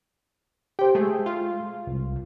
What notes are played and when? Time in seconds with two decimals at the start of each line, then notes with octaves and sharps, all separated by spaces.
0.79 G4 C5 G5
0.95 G#3 A3 G#4
1.26 F4
1.87 C2